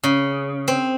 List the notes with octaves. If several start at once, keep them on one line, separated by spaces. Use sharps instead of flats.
C#3
C4